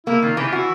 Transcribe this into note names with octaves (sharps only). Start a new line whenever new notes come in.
A#3 E4
D#3 F4
E3 G4
F4
F#4
E4